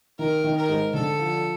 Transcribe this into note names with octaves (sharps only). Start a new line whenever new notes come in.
D#3 A#4
D#3
A#4
G#2
D3 A4
F3